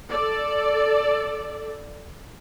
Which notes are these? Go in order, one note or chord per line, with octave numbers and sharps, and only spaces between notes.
A4 D5